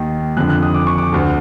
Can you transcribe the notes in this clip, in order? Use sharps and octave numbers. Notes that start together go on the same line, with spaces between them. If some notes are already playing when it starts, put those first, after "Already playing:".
Already playing: D#2 D#3
F2 D3 F#6
F#6
D#6
D6
C#6
D6
D2 D3